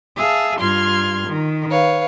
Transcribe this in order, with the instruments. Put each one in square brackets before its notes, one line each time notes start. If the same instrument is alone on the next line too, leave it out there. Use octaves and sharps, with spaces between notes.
[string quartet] G#4 E5 F5 A5
G2 F4 C6 F6 G#6
D#3
B4 C#5 F5